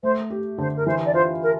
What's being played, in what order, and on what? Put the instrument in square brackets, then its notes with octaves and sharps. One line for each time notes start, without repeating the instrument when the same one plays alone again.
[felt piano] A3 [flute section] C5
[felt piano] G4
[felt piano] D3 [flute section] C5
[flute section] A#4
[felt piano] E3 [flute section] C5
[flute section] D5
[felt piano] F4 [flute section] C5
[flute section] A#4